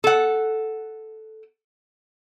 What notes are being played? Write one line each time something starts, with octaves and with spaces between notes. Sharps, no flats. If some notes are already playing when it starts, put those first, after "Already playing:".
A4 F#5